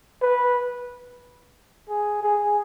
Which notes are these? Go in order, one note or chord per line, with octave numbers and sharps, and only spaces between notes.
B4
G#4
G#4